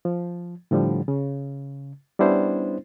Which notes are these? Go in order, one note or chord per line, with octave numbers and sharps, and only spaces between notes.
F3
A2 D3 F3 G3
C#3
G3 B3 C#4 D4 E4 C5